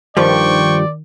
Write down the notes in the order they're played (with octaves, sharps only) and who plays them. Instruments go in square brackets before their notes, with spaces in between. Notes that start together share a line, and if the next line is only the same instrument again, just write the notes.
[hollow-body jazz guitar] G2 F3 G3 [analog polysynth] D#3 [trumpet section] C5 G5 C#6 [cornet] D5